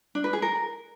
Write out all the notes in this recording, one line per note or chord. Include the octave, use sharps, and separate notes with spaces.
D4
B4
G#4
A#4